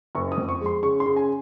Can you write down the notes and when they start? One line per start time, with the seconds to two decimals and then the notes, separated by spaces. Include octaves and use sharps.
0.15 F#1 C#6
0.32 D#6
0.37 F2
0.49 C#6
0.61 G#3 C6
0.83 C#3 C#6
1.00 C6
1.06 C#3
1.16 G#5